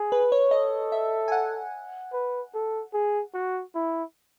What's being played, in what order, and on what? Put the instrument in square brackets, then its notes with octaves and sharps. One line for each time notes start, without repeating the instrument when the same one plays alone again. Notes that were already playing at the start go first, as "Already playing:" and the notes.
Already playing: [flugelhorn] G#4
[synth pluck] B4
C#5
[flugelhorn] A4 [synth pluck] D#5
[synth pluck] E5
G#5
F#5
[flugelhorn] B4
A4
G#4
F#4
E4